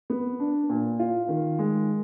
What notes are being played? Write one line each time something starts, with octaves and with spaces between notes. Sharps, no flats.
B3
D4
A#2
F4
D#3
G#3